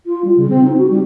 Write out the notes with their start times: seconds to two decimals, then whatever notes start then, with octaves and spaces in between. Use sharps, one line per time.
0.06 F4
0.25 G3
0.37 C#3
0.50 C4
0.64 D#4
0.77 F#4
0.90 G3